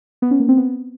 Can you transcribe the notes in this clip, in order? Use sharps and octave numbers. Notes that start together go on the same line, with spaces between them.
B3
C#4
A#3
C4
B3